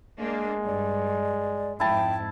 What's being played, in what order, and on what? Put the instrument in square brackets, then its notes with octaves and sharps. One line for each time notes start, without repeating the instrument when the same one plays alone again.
[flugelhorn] G#3 [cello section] A#3 D4
[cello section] G2 [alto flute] D5
[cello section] F2 G#2 [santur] E4 A5 [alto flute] G5